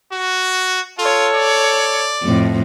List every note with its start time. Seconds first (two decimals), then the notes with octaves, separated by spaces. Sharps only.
0.12 F#4
0.99 F4 A4 C#5
1.34 D5
2.24 F2 A2